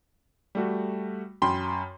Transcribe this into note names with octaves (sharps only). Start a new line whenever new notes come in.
G3 A3 F#4
F#2 G5 B5 C6 G7